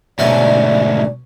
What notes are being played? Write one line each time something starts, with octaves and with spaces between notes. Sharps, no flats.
D2 G#2 B2 C#4 D5 E5 G#5